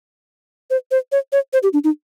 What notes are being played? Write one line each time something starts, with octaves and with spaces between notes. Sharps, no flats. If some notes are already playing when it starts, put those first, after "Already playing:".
C5
C5
C#5
C#5
C5
G4
D4
D#4